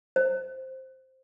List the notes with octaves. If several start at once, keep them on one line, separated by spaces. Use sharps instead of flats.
C5